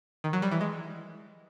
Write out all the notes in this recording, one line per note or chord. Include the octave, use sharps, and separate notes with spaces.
D#3
F#3
G3
E3
G#3